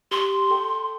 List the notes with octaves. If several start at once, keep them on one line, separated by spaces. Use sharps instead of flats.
G4 C6
A4 G5